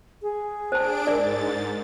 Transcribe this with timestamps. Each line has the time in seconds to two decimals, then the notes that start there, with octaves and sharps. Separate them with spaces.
0.22 G#4
0.72 D4 C5 A5 D7
1.07 G#2 A#4 D5 A6